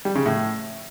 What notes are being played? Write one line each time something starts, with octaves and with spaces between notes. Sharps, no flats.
G3
C#3
A2